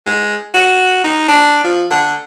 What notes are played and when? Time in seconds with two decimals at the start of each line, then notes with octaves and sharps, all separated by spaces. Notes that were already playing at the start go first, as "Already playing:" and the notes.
0.06 G#3
0.54 F#4
1.04 D#4
1.28 D4
1.64 F3
1.91 D3